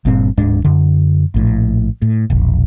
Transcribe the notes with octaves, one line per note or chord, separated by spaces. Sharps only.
G1 G2 A#2 C4
D1 G#2 G#3 D4
F#2 D3
A#1 A2
A2
E1 A#1